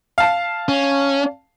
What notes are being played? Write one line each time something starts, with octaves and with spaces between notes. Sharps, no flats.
F5 A5
C#4